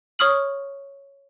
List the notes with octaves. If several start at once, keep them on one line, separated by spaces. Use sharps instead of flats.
C#5 C#6 D#6 F6 F#7